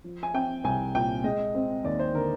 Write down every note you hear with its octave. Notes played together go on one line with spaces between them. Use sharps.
F3
G#5
C4 G5
C2 G#5
A#2 G5
G#3 D#5
C4
D#2 D5
C5
D3 A#4